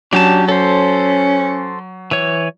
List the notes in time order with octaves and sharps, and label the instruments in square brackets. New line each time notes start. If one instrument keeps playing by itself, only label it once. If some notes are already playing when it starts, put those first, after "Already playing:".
[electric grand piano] F#3 [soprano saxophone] C#4 [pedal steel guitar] D4 G4 A5
[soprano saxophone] C#4 [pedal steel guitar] A4 C5
[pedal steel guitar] E3 C#5